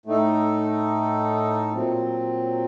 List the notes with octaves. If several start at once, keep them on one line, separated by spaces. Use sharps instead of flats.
A2 A3 D#4 A4
A#2 F#3 C4